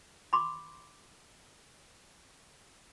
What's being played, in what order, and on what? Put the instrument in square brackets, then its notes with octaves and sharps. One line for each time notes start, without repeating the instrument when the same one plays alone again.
[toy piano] B5 C6 D6